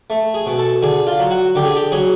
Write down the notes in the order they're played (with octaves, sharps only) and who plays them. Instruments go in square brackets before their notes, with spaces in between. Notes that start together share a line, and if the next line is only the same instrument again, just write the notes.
[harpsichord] A3
G#4
B2
A4
D3 G#4
F4
F#3
F#4
D3 G4
G#4
G4
F#3 G#4